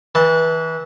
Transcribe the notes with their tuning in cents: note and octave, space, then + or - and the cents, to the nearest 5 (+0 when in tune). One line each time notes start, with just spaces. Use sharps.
E3 -25 A5 +0